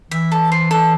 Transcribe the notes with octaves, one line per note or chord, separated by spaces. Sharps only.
E3 E5
A4
C5
A4